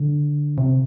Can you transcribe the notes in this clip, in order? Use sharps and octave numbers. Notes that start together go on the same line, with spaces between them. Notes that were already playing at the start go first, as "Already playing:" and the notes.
Already playing: D3
C3